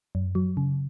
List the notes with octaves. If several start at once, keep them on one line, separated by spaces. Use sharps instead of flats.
F#2
F#3
C#3